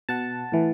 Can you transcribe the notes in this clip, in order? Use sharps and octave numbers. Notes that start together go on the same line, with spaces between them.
B2 F#5 A5
A2 E3